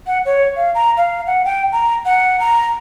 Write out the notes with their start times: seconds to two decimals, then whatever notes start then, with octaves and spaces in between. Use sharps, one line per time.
0.07 F#5
0.25 C#5
0.56 F5
0.75 A#5
0.97 F5
1.27 F#5
1.45 G5
1.72 A#5
2.05 F#5
2.40 A#5